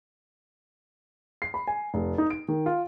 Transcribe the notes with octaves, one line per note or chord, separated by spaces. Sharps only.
C7
B5
G#5
F1
D#4
D7
D#3
F4